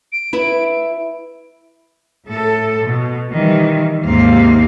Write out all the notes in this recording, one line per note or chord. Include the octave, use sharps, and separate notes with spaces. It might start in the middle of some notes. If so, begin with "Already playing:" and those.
D7
E4 B4 E5
A2 A4
B2
D#3 E3 G3
D#2 G#2 C3 A#3 C4 F5